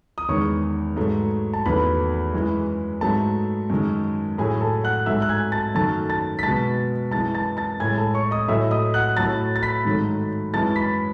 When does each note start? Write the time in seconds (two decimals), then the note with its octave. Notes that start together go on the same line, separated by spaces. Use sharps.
0.18 D#6
0.28 E2 D#3 G#3 C#5 C#6
0.96 G#2 F#3 A3
1.53 A5
1.66 E2 D#3 F#3 A3 B4 B5
2.34 F#2 E3 G#3
3.01 G#2 F#3 A3 A4 A5
3.70 F#2 D#3 G#3
4.38 A2 F#3 A3 G#4 G#5
4.61 A4 A5
4.84 F#5 F#6
5.06 G#2 F#3 A3 E5 E6
5.22 F#6
5.29 G#5 G#6
5.52 A5 A6
5.75 F#2 D#3 F#3 A3 A5 A6
6.09 A5 A6
6.39 B6
6.43 B2 G#3 A5 A6
7.11 F#2 E3 G#3 A5 A6
7.35 A5 A6
7.57 A5 A6
7.80 A2 G#3 G#5 G#6
7.98 A4 A5
8.14 C#5 C#6
8.31 D#5 D#6
8.48 A2 F#3 A3 E5 E6
8.71 D#5 D#6
8.94 F#5 F#6
9.16 A2 F#3 A3 A5 A6
9.56 A6
9.63 B5 B6
9.85 G#2 D#3 F#3 A3
10.53 F#2 E3 G#3 A5 A6
10.76 B5 B6